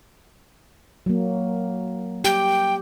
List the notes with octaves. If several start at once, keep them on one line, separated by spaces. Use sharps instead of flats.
F#3 A#3
G4 G5